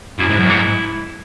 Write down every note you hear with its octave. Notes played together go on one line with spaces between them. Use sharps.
F#2 E4
G#2
F#2
G#2